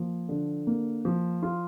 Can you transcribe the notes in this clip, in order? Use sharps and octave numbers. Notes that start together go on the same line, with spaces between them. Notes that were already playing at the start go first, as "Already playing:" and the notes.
Already playing: F3 A#3
D3
A#3
F3
F4